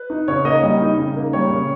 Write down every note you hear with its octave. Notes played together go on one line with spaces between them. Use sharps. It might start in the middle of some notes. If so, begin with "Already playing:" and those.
Already playing: B4
D#4
C#3 C#5
A#3 D#5
G3 D#5
D#4
C#3
A#3
G3 C#5
C#3